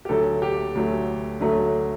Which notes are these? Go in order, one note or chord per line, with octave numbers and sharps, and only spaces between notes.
G4
D2 D3 F#3 A3 A4
G4
D2 D3 F#3 A3
D2 D3 F#3 A3